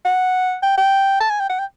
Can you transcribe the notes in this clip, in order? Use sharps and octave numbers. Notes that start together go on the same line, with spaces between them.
F#5
G5
G5
A5
G#5
G5
F#5
G5